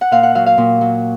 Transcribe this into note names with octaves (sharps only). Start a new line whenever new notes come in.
F#5
A#2 F5
F#5
F#3 F5
F5
A#2
F#3